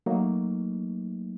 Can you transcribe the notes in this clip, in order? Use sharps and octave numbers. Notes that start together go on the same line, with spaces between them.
F#3 A3 A#3 D#4